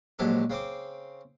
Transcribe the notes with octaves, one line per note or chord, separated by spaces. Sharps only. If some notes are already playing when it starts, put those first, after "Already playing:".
A#1 G#2 F#3 G4 A4
C#3 C4 C6 D6